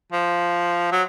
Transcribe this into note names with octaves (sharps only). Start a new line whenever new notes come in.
F3
F#3